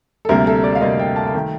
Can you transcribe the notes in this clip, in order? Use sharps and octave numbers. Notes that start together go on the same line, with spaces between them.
A4
D2 C3 G3 A#3 A#4
A4
D5
F5
D2 C3 G3 A#3 D#5
G5
A5
A5
D#3 A3 G5